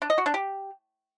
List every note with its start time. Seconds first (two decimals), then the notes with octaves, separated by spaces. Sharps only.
0.02 D4
0.10 D#5
0.18 F#4
0.26 D4
0.34 G4